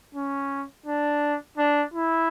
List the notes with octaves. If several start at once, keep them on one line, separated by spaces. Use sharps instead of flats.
C#4
D4
D4
E4